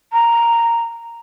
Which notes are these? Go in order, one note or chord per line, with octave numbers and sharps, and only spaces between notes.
A#5